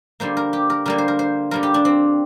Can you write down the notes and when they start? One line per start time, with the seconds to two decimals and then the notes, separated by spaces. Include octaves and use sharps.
0.20 D3 G3 A#3 C5
0.37 A#4
0.53 G4
0.70 A#4
0.86 D3 G3 A#3 A#4
0.98 C5
1.08 A#4
1.19 C5
1.51 D3 G3 A#3 A#4
1.63 G4
1.74 D4
1.85 C4